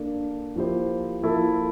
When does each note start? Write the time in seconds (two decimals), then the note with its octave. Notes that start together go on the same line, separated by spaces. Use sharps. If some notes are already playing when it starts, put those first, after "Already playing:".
Already playing: A#3 D4 A4
0.56 F3 A#3 E4 G4 C5
1.22 F3 A#3 E4 A4